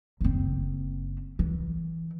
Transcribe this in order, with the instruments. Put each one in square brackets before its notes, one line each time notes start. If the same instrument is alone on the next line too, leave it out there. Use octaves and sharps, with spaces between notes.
[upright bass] F#1 C4
E3